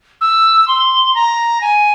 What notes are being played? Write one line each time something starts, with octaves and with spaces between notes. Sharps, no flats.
E6
C6
A#5
G#5